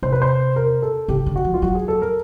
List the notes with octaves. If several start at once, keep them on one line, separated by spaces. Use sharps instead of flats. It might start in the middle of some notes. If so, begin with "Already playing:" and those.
C3 C5
B4
C5
A#4
A4
C#3 G4
D3
F#4
F3
F4
F#3 F#4
G#4
A4
A#4